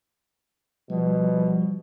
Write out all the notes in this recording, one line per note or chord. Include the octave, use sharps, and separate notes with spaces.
B2 F3 G3